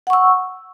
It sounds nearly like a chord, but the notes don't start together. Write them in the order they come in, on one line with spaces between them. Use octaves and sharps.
F#5 C#6 E6